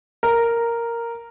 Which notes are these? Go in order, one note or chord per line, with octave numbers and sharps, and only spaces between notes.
A#4